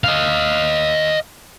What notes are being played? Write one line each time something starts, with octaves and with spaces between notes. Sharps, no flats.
D#5 F5